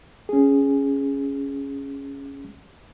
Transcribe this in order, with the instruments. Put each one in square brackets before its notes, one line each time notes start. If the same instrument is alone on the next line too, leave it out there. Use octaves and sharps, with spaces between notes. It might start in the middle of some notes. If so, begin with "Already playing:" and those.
[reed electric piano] C#4 G#4